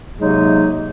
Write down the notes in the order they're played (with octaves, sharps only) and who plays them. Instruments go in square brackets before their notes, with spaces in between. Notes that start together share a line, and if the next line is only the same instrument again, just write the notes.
[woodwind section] C3 F#3 G#3 A#3 D#4 G#4